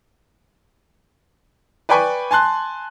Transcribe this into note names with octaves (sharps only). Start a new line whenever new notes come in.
B4 D5 G5 G#5 B5 C#6
G#5 A5 C6 F#6